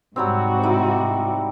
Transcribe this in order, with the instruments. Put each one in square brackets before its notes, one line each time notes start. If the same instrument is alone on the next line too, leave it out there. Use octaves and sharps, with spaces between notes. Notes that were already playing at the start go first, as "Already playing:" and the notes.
[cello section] G#2 C3 F#4 [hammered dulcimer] F#3 G3 C4
[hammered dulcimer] D#4 E4 D5